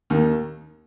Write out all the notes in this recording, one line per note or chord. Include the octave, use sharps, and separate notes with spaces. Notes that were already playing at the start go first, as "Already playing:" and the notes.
D#2 D#3